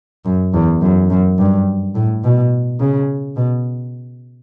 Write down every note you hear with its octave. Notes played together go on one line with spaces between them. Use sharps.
F#2
E2
F#2
F#2
G2
A2
B2
C#3
B2